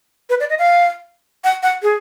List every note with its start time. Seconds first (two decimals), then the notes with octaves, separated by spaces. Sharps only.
0.30 B4
0.40 D5
0.50 D#5
0.59 F5
1.44 F#5
1.63 F#5
1.82 G#4